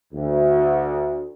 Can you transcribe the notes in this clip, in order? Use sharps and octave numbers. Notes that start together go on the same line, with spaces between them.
D2